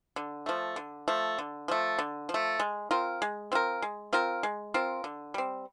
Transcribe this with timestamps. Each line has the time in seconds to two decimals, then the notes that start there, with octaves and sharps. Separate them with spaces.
0.16 D3
0.46 F3 A3
0.76 D3
1.08 F3 A3
1.38 D3
1.68 F3 A3
1.99 D3
2.29 F3
2.34 A3
2.59 G#3
2.91 C4 F4 A#4
3.22 G#3
3.52 C4 F4 A#4
3.82 G#3
4.13 C4 F4 A#4
4.43 G#3
4.74 C4 F4 A#4
5.04 D3
5.34 G3 C4